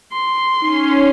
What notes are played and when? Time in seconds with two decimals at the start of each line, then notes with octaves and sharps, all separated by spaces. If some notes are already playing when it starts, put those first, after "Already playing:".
0.13 C6
0.62 C#4 D#4